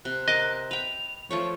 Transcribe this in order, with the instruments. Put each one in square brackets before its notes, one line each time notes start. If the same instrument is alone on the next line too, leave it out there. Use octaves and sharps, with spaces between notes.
[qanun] C3 [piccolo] F#6
[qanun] A#4 D6 [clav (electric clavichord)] D#5
[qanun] B4 G5 [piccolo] F7
[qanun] F3 A3 C#5 [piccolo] C#6